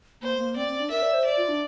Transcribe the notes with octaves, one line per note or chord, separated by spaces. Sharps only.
A#3 C5
A#3
C4 D5
C4
D4
A#4 E5
D5
C5
D5
F4
D4